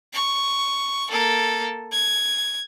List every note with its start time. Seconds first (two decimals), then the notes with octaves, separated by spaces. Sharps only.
0.13 C#6
1.10 A#3 A4
1.92 G#6